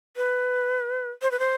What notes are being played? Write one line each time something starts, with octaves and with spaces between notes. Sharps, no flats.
B4
C5
B4
C5